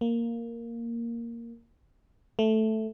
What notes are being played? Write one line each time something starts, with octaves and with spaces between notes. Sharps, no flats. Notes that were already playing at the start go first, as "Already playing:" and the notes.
A#3
A3